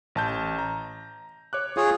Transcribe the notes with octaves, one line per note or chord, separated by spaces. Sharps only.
A1 A5 G6
A#5
C#5 D6 F#6
F4 G#4 C#5